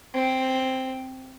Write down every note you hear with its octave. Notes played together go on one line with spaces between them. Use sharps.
C4